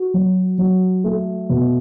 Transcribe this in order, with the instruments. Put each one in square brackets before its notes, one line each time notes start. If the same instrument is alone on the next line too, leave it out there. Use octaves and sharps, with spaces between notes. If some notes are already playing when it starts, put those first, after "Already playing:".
Already playing: [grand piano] F#4
F#3
F#3
A3
B2